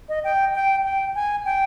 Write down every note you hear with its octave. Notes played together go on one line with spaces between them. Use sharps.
D#5
G5
G5
G5
G#5
G5